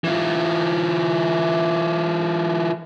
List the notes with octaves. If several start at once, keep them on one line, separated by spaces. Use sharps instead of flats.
E3 F4